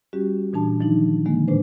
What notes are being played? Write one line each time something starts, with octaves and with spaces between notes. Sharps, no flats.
G3 C#4 F#4 G4
A#2 E3 D4 A5
D#3 F3 D4 D#4
D3 D#3 F3 G#3 A#3
A2 G#3 D4 B4 C5